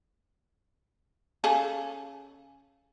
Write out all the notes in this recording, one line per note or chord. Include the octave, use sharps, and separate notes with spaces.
C#3 G#4 A4